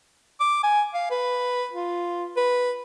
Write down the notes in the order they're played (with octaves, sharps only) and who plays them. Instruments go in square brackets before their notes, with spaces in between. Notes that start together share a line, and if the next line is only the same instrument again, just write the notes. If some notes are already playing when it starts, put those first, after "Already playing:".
[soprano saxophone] D6
G#5
F5
B4
F4
B4